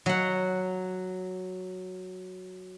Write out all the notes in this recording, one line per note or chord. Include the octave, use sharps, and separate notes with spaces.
F#3 F#5